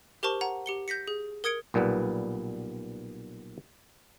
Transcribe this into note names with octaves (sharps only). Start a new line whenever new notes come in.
G4 A#4 C5 A5 C#6
F#5 A#5
G4 C#7 G7
G6 A#6 B6 C#7
G#4
A#4 D#6 G#6 C#7 D7
B1 A#2 G3 B3 B4